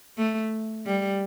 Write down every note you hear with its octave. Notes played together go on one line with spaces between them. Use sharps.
A3
G3